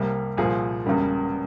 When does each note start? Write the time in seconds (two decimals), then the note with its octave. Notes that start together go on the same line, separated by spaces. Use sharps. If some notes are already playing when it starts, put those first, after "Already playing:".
Already playing: C2 C3 G3 A#3
0.37 C2 A#2 F3 A#3 G#4
0.86 E1 E2 C#3 G3 A#3